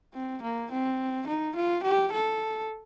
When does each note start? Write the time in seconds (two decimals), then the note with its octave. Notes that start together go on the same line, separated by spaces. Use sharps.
0.14 C4
0.42 A#3
0.71 C4
1.27 D#4
1.56 F4
1.84 G4
2.12 A4